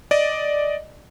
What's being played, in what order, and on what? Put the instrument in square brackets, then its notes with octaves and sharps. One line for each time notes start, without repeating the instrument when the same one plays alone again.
[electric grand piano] D5 D#5